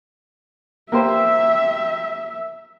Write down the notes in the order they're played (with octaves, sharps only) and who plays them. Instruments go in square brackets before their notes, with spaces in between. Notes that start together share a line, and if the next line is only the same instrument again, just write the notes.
[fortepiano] A#3 G4 C5 [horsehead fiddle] E5